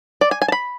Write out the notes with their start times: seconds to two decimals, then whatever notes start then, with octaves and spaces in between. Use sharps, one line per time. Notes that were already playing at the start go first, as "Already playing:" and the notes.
0.21 D5
0.31 G#5
0.42 G#5
0.48 A5
0.52 B5